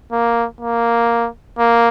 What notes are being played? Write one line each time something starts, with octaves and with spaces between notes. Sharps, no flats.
A#3
A#3
A#3